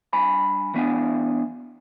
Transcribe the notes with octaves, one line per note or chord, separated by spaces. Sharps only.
G2 G#5 B5
E3 B3 D4 G#5